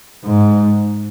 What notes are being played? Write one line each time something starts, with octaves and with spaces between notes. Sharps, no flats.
G#2